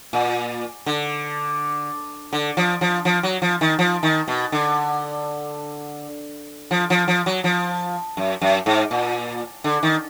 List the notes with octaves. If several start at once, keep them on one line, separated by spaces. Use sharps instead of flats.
A#2
D3
D3
F3
F3
F3
F#3
F3
D#3
F3
D#3
B2
D3
F3
F3
F3
F#3
F3
F#2
F#2
G#2
A#2
D3
D#3